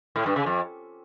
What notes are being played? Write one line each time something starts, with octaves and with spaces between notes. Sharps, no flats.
A2
G2
C#3
F2